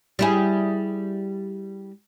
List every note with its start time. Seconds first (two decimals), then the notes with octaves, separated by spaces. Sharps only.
0.19 G3 E4 G#4